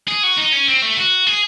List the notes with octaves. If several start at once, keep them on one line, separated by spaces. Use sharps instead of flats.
G#4
F#4
D#4
C#4
C4
A3
F#4
G#4